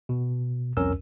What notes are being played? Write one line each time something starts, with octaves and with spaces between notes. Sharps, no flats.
B2
C2 F2 C#4 A#4 E6